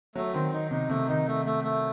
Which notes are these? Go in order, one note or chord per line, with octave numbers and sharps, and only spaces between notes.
F#3 A3
D#3 C4
D#4
C3 D#4
C3 A3
D#3 D#4
A3
A3
A3